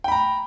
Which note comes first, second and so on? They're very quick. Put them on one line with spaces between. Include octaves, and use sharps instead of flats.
G5 B5 A#5